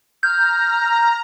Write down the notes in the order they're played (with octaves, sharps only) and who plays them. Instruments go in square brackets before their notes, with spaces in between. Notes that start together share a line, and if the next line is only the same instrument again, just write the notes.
[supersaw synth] A#5 [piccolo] F6 [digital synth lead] G6